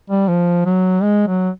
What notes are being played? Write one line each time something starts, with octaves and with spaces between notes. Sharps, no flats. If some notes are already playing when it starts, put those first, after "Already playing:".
G3
F3
F#3
G#3
F#3